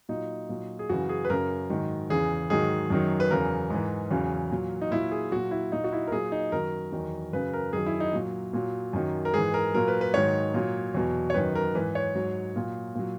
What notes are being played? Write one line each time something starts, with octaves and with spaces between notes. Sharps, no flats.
A#2 F#3 D#4
A#2 F#3
G#4
F#2 C#3 E3 F#4
G#4
B4
F#2 C#3 F#3 A#4
G#2 D#3 F#3
E2 C#3 E3 G#4
G#2 D#3 F#3 G#4
F#2 D#3 F#3
B4
E2 C#3 F#3 A#4
G#2 E3
E2 C#3 F#3
A#2 F#3
D#4
A#2 F#3 E4
G#4
A#2 F#3 F#4
E4
A#2 F#3 D#4
F#4
E4
A#4
A#2 F#3 G#4
D#4
F#2 D#3 F#3 A#4
E2 D#3 F#3
F#2 C#3 F#3 B4
A#4
F#2 D#3 F#3 G#4
E4
D#4
A#2 F#3
A#2 F#3
F#2 D#3 F#3
A#4
G#2 E3 G#4
A#4
A#2 F#3 A#4
B4
B4
G#2 D#3 F#3 C#5
A#2 F#3
E2 B2 F#3
C#5
F#2 D#3 F#3 B4
A#4
G#2 E3 B4
C#5
G#2 F#3
A#2 F#3
A#2 F#3